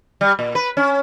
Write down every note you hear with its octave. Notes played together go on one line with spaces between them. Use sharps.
G3
A#2
B4
C#4